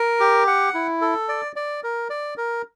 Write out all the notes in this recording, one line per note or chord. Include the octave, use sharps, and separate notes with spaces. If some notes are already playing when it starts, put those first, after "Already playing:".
Already playing: A#4
G4
F#5
E4
A4
D5
D5
A#4
D5
A#4